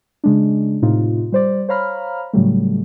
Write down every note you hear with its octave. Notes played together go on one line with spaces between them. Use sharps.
C#3 G#3 D4
A2 C3 D#4 F4
G3 C5 D5
C5 C#5 F5 A#5 B5 F6
A2 C#3 F#3 G3 A3